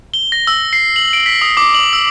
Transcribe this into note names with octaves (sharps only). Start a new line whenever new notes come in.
G7
A#6
E6
C7
F#7
D7
B6
D#6
D6
F#7
E6